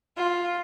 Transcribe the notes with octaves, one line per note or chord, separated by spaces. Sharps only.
F4